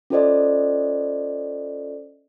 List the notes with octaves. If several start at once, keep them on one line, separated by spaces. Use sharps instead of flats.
C#4 F4 A4 C5 D5 D#5